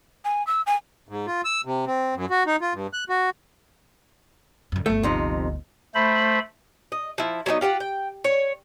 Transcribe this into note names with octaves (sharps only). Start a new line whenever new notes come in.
G#5
E6
G#5
G#2
F4
E6
C3
C4
F#2
F#4
D#4
F4
G2
F#6
F#4
F#2 D3
G1 D2 A3
F2 C3 D#4
A3 C5 B5
D#5
F3 E4
F#3 B3 C4 D#4
F4 G4 C#5 F#5
G5
C#5